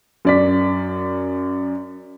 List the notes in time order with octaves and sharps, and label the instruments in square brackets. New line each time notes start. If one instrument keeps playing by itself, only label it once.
[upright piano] F#2 D5 B6